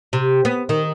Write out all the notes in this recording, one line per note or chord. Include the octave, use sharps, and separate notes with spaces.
C3
B3
D#3